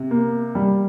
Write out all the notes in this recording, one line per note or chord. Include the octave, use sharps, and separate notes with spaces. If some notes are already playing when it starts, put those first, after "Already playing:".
Already playing: C3
A#3
G3